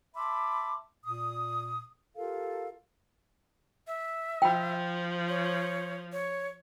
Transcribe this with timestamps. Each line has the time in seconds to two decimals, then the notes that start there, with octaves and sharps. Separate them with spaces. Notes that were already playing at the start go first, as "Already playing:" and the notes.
0.16 E5 A5 B5 C6 D6
1.05 A#2 D#6
2.17 F4 G4 A4 A#4 F5
3.87 E5
4.42 F3 G5 B5
5.29 C#5
6.12 C#5